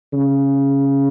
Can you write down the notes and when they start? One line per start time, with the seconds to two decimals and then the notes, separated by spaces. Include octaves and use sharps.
0.13 C#3